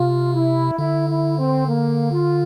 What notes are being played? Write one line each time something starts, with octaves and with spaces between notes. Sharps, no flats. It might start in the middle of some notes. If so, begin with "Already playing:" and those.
Already playing: C3 F4
E4
D3 E4
E4
C4
A#3
F4